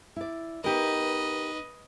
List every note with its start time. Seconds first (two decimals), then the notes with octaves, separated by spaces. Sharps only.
0.16 E4 D5
0.64 B3 D#4 G4 A#4 B4 D#5